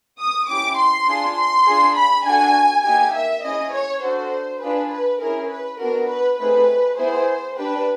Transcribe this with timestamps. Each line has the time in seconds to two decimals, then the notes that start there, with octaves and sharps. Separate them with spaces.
0.18 D#6
0.48 C#4 E4 G4 D6
0.77 C6
1.07 D4 F4 G#4
1.36 C6
1.66 D4 F4 G#4
1.96 B5
2.25 D4 F#4 A4 G#5
2.84 A#3 D#4 G4 G#5
3.14 E5
3.43 C#4 E4 G#4 D#5
3.73 C#5
4.02 D4 F#4 A4 C5
4.61 D4 F4 G#4 B4
4.91 B4
5.21 C#4 E4 G#4 A#4
5.49 B4
5.79 B3 D4 F#4 A#4
6.09 B4
6.39 A3 C4 D#4 G#4 B4
6.97 B3 E4 G#4 C5
7.56 D4 G4 B4